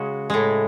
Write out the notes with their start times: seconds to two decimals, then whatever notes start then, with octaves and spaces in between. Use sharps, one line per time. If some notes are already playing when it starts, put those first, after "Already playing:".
Already playing: C#3 G#3 F#4
0.30 A2 G#3